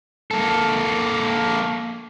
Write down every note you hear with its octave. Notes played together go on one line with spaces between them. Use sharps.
A#3 A4